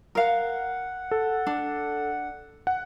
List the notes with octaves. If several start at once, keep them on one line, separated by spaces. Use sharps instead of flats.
A#4 F5 F#5
A4
D4
F#5